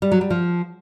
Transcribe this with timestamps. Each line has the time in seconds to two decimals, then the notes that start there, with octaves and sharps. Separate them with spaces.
0.02 G3
0.11 F#3
0.21 G3
0.30 F3